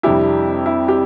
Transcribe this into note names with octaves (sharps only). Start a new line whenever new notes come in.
F2 C3 G3 D4 E4 G4
E4
G4